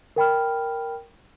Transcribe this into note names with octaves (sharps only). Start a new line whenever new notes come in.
A#4 G5 B5 F6